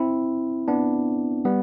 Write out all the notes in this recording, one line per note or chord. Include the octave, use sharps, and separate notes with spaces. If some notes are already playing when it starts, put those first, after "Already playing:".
Already playing: C4 E4
B3 D4
G3 B3